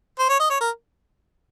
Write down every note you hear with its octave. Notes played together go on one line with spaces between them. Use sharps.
C5
C#5
D#5
C#5
A#4